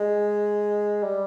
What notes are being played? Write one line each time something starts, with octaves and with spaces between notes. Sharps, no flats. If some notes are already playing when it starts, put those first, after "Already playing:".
Already playing: G#3
G3